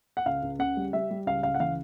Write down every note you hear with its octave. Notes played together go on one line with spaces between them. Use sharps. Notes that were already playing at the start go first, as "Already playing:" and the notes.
F#5
C#2 F5
C#2
C#3 F#5
G3
G3 E5
G3
C#2 F5
C#2 F5
F#5
E3 F5